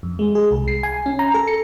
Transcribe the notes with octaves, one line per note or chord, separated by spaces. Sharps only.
F2
G#3
G#4
C2
C7
G#5
C#4
A#5
A4
C#7